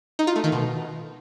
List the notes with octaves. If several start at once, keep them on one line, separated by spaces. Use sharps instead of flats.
D#4
F4
A3
D#3
B2